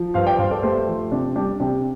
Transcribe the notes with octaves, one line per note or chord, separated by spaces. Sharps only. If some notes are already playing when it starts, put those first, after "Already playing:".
Already playing: F3
G2 C5 F5
D5 G5
G2 C5 F5
A4 D5
A3 G4 C5
F3
C3 D4
G3 D4 G4
C3 D4 G4